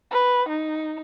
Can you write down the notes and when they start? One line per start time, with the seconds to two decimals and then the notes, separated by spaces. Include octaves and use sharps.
0.11 B4
0.49 D#4